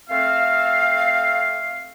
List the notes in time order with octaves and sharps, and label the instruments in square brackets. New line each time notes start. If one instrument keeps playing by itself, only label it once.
[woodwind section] A3 C4 A4 F5